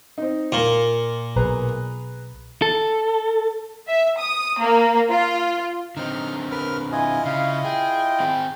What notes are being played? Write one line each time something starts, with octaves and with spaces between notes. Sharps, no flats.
C4 D#4
A#2 F5
B1 G#4 B4 A#5
A4
E5
D#6
A#3
F4
D3 C4 D#4 F6
A#4 B4 F6
E4 F4 D#5 G#5
C#3 F5
G#4 G5
C4 G#4